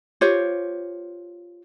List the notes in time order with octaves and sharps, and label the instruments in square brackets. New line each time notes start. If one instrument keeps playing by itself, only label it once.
[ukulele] F4 G4 C5 C#5